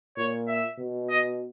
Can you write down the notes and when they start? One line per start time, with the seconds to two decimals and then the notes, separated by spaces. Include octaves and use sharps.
0.17 A#2 C#5
0.47 E5
0.78 B2
1.09 D#5